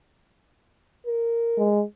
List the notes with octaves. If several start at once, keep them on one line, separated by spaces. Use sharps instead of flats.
A#4
G#3